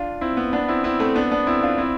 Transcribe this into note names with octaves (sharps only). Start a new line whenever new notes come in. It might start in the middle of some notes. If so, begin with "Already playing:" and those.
Already playing: D4 F4
C4 E4
B3
B3 D4
C4 E4
C4 E4
A3 C4
B3 D4
B3 D4
C4 E4
D4 F4
C4 E4